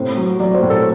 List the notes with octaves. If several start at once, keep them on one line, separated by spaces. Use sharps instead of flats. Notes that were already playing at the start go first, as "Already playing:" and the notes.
Already playing: A2 C3 C5
F#3
F#3 D5
C5
A2
A4